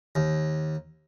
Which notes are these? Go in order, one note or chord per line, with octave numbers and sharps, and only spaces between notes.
D#2